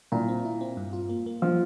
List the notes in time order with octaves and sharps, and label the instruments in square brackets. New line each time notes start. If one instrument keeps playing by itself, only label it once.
[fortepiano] A#2 [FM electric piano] E4
[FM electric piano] C4
E4
C4
G2
F4
A#3
A#3
[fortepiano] F3 [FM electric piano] C5